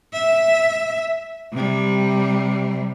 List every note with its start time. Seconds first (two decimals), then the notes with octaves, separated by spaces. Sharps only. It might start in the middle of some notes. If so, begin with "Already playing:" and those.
0.13 E5
1.53 C3 G3